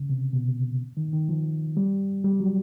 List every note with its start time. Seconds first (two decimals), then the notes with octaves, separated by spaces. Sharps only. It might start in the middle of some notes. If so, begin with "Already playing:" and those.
Already playing: C#3
0.10 C3
0.33 B2
0.97 D#3
1.13 D#3
1.29 F3
1.77 G3
2.24 G3
2.40 F#3